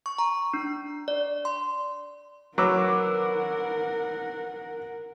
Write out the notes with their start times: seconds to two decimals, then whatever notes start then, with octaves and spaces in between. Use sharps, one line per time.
0.06 C#6
0.18 A#5
0.54 D4
1.08 D5
1.45 C6
2.58 F#3 A#4 B4 F#5 D6 E6